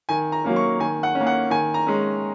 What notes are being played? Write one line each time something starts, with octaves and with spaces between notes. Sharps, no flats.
D#3 G#5
A#5
F#3 A#3 C#4
C#6
D#3 G#5
F#5
C#4
A#3
F#5
D#3 G#5
A#5
G#3 C#4